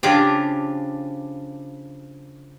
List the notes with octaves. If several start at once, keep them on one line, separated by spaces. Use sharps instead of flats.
C#3 F3 D4 G4